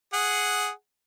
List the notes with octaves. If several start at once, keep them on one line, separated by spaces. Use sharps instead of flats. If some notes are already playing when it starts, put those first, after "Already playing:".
G#4 F#5